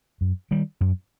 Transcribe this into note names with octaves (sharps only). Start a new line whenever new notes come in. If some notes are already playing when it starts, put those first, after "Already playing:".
F#2
D#3 G3
F#2